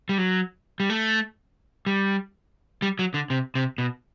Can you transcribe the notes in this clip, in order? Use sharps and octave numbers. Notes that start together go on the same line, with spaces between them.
G3
F#3
G3
A3
G3
G3
F#3
D3
C3
C3
B2